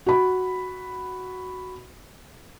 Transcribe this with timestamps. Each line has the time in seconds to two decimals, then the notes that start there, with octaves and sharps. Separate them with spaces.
0.06 F#4 B5